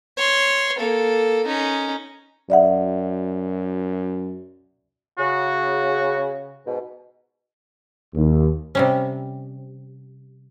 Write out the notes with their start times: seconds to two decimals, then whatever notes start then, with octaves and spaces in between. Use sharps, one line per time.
0.17 C#5 C6
0.78 A#3 A4
1.46 C#4 D#4
2.50 F#2 D5 E5 F#5
5.18 C#3 F#4
6.66 G#2 B2
8.14 D#2
8.75 C3 G3 C#4